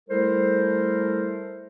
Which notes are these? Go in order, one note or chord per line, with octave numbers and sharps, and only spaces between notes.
G3 A3 E4 A4 A#4 C5